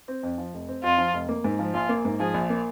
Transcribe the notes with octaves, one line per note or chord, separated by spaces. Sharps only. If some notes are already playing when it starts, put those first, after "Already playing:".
C4
F2
F3
F1
C4
F2 F4
F3
F1
A#3
G#2
F3
A#1 F4
A#3
G#2
F3 G#4
A#1
A#3